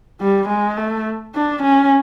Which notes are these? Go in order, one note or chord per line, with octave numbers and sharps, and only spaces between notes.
G3
G#3
A3
D4
C#4